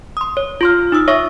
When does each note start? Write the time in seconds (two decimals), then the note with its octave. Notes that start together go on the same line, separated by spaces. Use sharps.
0.17 C6 D#6
0.37 C#5
0.61 F4 C6 F6
0.92 D#4 D#6 E6
1.08 C#5 E5 C#6 D#6 A#6